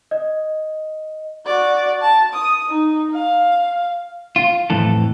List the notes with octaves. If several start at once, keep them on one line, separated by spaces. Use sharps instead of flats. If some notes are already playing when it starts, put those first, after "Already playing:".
D#5
F#4 D5
A5
D#6
D#4
F5
F4
F2 A2 E3 A4